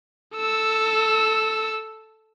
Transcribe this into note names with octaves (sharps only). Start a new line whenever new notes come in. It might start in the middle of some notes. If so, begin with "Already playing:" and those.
A4 E6